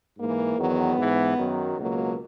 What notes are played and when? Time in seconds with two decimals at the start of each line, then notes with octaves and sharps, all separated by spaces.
0.18 G#2 E3 A#3
0.57 E2 D#3 F#3 B3
0.98 G#2 E3
1.38 F#2 D#3 F#3
1.78 C#2 B2 F#3 A#3